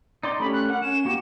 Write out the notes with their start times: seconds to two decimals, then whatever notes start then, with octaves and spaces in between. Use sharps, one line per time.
0.23 D#4 D5 C6
0.40 A3 C#4 G4 B5
0.53 F#6
0.69 A#4 F#5
0.82 C#4 E7
1.05 A#3 F#4 G4